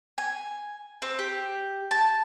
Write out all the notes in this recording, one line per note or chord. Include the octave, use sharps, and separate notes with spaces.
G#5
C4
G4
A5